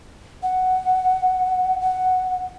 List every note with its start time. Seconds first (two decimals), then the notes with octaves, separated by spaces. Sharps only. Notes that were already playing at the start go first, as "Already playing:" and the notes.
0.43 F#5
1.81 F#5